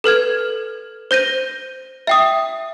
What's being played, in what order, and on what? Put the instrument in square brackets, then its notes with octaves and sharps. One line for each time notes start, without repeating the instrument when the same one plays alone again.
[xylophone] A4 B4 F6 G#6
C5 G6 A#6 D#7
E5 G5 D#6